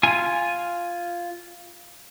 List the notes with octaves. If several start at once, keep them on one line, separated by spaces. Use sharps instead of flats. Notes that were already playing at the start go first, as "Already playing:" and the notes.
F4 G#5